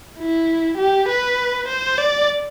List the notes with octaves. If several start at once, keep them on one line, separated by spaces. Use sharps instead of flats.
E4
G4
B4
C5
D5